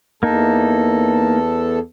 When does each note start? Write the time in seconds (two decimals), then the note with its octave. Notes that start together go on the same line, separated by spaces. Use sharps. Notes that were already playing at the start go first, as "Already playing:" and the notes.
0.23 E2 A#3 D#4 A4